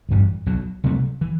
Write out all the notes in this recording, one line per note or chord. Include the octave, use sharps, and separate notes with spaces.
A1 G2 E3 G3
B1 B2 F#3
C2 C3 F#3 A3
E3